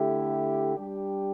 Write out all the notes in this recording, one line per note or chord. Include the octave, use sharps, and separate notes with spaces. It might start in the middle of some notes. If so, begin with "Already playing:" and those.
Already playing: D3 A3 E4 G4
G3 D4 G4